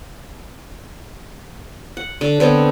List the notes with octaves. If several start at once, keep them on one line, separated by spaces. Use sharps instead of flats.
F#5
D3
D3 B3 C4 C#5